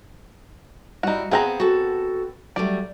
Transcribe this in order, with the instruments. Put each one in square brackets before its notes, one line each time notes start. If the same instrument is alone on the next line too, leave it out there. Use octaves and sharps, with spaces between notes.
[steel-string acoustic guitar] G3 E4 [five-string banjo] D#4 F#4
[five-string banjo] B3 C4 A#5 [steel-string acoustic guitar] G#4 F5 F#5
[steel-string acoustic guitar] F#4 A4
[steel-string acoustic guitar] F#3 G3 A3 [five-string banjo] D5